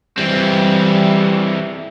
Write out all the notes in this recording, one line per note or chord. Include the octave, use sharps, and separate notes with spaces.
E3 G3 C4